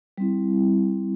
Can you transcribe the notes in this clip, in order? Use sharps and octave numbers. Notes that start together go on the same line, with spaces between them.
G3 C4 E4